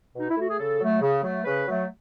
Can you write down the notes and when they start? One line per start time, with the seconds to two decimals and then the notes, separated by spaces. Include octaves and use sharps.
0.15 B2 D#4
0.29 E4
0.37 A3 F#4
0.49 G#4
0.59 C#3 A4
0.80 F#3 A3
1.02 C#3
1.23 F#3 A3
1.45 C#3 B4
1.68 F#3 A3